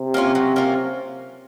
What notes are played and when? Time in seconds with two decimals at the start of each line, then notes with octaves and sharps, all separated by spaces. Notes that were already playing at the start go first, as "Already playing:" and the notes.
Already playing: C3
0.14 A#3 C#4 F4
0.35 F#3
0.56 A#3 C#4 F4